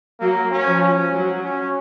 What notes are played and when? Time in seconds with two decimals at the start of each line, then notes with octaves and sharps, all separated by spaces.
0.20 F#3 A#3
0.51 C#4
0.67 F3
0.81 C#4
1.12 F#3
1.44 C#4